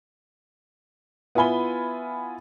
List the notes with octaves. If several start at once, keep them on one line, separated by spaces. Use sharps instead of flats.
B3 E4 F4 G#5 B5 G7